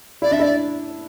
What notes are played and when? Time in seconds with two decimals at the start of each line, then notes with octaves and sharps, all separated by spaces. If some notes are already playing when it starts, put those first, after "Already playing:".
0.22 E4 D5
0.31 D4 E5
0.40 E4 D5